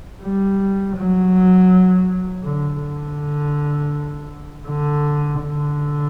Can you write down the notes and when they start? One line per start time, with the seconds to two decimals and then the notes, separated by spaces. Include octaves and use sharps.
0.23 G3
0.97 F#3
2.44 D3
2.82 D3
4.67 D3
5.41 D3